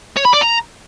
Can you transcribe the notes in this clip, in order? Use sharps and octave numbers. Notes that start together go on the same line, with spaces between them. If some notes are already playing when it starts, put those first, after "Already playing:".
C#5
B5
D5
A#5